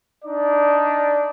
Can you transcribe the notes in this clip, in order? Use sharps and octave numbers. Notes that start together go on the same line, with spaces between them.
D4 D#4 D5